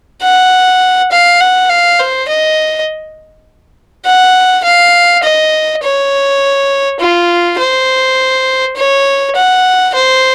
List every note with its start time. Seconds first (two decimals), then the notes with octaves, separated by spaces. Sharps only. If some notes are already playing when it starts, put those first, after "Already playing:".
0.22 F#5
1.12 F5
1.41 F#5
1.70 F5
1.99 C5
2.28 D#5
4.06 F#5
4.64 F5
5.23 D#5
5.83 C#5
7.00 F4
7.59 C5
8.76 C#5
9.36 F#5
9.95 C5